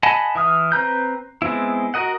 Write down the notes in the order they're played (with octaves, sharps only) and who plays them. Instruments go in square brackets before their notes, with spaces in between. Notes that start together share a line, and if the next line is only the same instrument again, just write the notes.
[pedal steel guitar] D#5 F#5 G#5 A5 B5
E3 E5 D#6 F6
C4 B4 A#5 G6
G#3 B3 C4 E4
F#4 A#4 D#5 F#5